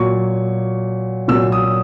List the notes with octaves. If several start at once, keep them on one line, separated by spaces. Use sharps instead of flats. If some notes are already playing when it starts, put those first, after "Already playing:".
Already playing: A#2 F#3 C#6
A#2 F#3 E6
D#6